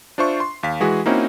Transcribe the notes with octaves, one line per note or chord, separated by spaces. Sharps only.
D4 F4 C5 E5 C#6
C6
D#2 F5 B6
E3 G#3 F#4 G#4
A#3 C4 C#4 D#4 E4 F#4